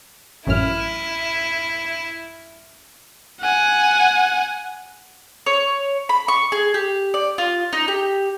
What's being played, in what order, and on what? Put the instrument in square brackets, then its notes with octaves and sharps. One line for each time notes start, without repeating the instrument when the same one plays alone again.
[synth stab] A1 F#2 F6 [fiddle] E4
[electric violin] F#5 G#5
[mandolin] C#5
B5
C#6
G#4
G4
D5
F4
D#4
G4